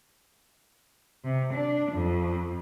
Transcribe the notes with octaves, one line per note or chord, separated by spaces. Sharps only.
C3
D4
F2